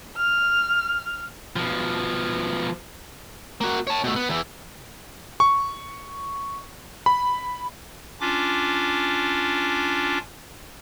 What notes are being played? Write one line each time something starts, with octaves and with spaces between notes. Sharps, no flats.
F6
B2 F3
A#3 F#4
C#5 A5
B2 A3
B3
E2 E3
C#6
B5
C#4 D4 F4 D6